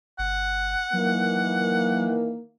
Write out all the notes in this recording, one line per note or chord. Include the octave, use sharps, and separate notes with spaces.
G1 F#5
D#3 E3 F#3 A#3